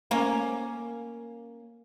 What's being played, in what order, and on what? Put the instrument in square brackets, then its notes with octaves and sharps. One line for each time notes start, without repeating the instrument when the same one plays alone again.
[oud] A#3 C#4